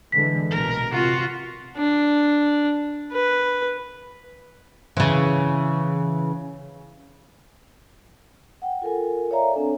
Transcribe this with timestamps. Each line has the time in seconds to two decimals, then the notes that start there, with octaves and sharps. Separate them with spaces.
0.12 D3 E3 G#3 B6
0.51 A#1 B2 A#4
0.92 C3 F4 F#4
1.77 D4
3.12 B4
4.97 C#3 E3
8.62 F#5 G5
8.82 F4 A4 A#4 G#5
9.31 C#5 D5 E5 F5 G#5 A#5
9.54 C4 D4 A4